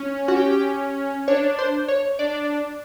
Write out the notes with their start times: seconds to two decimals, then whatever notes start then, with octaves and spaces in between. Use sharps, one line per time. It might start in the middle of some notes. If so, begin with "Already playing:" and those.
Already playing: C#4
0.28 F#4
0.36 G4
1.27 D4 C#5
1.59 C5
1.88 C#5
2.19 D4 D5